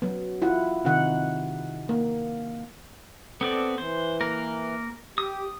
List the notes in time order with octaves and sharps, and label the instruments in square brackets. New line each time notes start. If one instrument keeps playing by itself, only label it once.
[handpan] F#3 B3
E4 F4 F#5
C3 D#3 D#4 F#5
A#3
[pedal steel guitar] B3 C4 D5 [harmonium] A4
[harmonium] E3 [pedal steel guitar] C5
[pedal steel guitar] A#3 A#4
[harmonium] G4 [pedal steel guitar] D#6